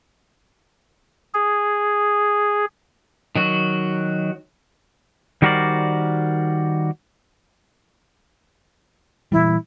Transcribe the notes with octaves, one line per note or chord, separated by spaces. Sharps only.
G#4
D#3 F#3 F#4
D#3 G3 F#4 A#4 C5 D5
A#2 E3 G3 E4